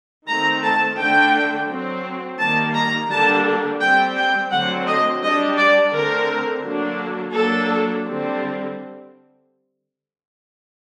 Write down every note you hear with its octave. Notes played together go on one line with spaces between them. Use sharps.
D#3 A3 C4 A#5
A5
D3 A3 D4 G5
F#3 C4
D#3 G3 A#3 A5
A#5
D3 G3 A#3 D4 A5
G3 C4 G5
G5
D3 F#3 A3 C4 F#5
D#5
G3 D4 D#5
D5
D3 A3 C4 A#4
D3 F#3 A#3 D4
F#3 A#3 D4 A4
D3 G3 C4